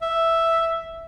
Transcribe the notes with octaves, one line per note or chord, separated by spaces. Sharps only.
E5